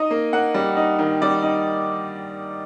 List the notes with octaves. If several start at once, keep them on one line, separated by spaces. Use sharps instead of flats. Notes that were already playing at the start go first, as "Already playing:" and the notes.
Already playing: D#4 D#5
A#3
A#3 F#5
G3
D#4
D#3
G3 D5
D#4